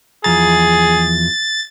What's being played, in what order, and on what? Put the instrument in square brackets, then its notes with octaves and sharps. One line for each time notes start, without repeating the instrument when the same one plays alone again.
[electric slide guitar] E2 F3 A#5 [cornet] G#4 [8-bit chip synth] A6